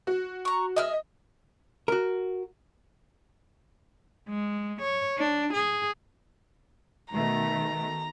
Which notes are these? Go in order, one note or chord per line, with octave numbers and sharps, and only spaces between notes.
F#4
A#5 C#6
G#4 D#5 E5 F6
F#4 A#4
G#3
C#5
D4
G#4
B2 D#3 A3 A#5